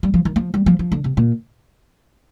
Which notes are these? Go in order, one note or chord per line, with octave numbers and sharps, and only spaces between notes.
G3
F3
D#3
F3
G3
F3
F3
D3
C3
A#2